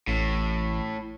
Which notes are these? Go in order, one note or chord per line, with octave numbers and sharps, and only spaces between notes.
A1 A2